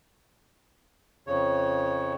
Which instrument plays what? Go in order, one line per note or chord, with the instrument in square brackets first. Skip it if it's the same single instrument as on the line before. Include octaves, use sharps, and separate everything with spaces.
[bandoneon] F2 C#3 C#5